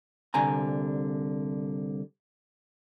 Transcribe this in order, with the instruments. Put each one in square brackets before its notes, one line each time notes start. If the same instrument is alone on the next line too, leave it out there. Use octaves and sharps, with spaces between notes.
[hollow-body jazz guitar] C2 D3 G#5 A#5